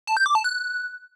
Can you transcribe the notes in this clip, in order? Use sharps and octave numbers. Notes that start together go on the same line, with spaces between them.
A5
G6
D6
A5
F#6